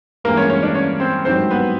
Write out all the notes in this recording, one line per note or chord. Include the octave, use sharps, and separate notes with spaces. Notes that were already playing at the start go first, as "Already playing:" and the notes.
A1 G2 E3 G#3 A#3 A#4
C#4 C#5
C#4 C#5
D4 D5
C#4 C#5
C4 C5
G#1 G2 D#3 F#3 C4 C5
B3 B4